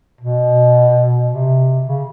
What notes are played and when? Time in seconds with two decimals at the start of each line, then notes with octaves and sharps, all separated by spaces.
0.21 B2
1.31 C3
1.86 C#3